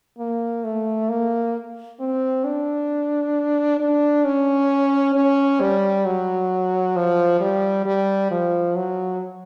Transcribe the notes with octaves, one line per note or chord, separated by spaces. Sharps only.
A#3
A3
A#3
C4
D4
D4
C#4
C#4
G3
F#3
F3
G3
G3
F3
F#3